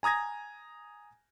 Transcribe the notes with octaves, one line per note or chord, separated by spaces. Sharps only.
G#5 A#5 D#6 G#6 A#6